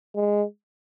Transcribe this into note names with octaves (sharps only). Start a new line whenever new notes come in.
G#3